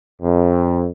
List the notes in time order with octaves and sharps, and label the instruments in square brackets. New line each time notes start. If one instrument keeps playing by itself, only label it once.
[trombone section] F2